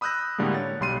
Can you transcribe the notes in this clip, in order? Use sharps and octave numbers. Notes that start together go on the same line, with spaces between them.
B5 D#6 E6 F#6 G6 A#6
A2 D3 G3 G#3 A#3
C#5 A6
B1 G3 C6 C7 D#7